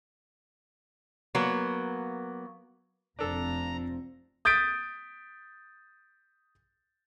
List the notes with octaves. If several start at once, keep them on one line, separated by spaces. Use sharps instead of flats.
F#3 A#3 B3
F1 F3 C4 D4 A4 A#5
D#6 G6 A6 B6 D7